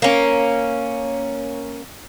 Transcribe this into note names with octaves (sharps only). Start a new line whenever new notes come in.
A#3 C#4